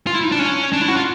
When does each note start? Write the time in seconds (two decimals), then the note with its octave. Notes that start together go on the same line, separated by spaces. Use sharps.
0.07 F4
0.14 E4
0.23 D#4
0.32 D4
0.39 C#4
0.73 D4
0.81 E4
0.88 F#4
0.97 F4